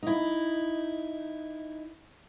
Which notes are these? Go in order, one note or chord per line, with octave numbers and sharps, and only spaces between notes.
D#4 E4